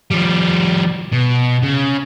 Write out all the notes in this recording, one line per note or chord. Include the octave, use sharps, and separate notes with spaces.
F3 G3
B2
C#3